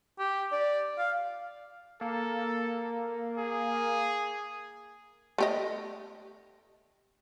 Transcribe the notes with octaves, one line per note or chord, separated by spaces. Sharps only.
G4
D5
F5
A#3 A4
G#4
A3 G4 D#5